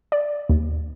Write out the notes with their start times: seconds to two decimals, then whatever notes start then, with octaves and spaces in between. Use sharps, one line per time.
0.12 D5
0.49 D#2